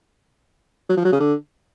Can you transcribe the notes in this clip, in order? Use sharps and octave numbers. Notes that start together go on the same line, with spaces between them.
F#3
F3
F#3
C#3
D3